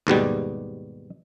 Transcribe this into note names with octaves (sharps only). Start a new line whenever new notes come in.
D#2 G#2 B2 G3